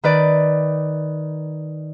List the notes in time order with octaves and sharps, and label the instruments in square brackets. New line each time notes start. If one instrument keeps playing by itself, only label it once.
[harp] D#3 B4 D5